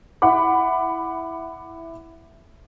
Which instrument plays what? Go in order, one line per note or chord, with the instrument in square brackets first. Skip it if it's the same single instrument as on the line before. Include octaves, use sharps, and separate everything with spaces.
[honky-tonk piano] E4 F#5 B5 D6